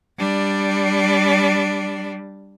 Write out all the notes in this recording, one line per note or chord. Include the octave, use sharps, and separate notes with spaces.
G3 D4